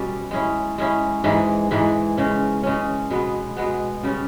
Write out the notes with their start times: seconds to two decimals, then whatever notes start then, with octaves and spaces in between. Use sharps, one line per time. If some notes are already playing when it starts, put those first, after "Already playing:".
Already playing: B2 G3 C#4
0.31 G#3 C#4 E4
0.78 G#3 C#4 E4
1.24 G#2 E3 G#3
1.71 G#2 E3 G#3
2.17 C#3 G#3 C#4
2.63 C#3 G#3 C#4
3.10 B2 G#3 B3
3.57 B2 G#3 B3
4.03 C#3 G3 C#4